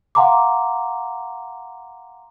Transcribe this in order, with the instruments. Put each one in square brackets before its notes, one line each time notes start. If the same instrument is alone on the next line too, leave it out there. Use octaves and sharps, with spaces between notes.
[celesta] F5 F#5 G#5 A#5 C6 D6